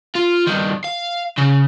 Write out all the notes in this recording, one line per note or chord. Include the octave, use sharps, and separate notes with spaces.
F4
G2 D#3
F5
C#3